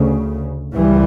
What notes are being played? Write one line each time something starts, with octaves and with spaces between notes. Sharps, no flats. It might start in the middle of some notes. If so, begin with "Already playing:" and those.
Already playing: D2 C#3
C#2 E3 G3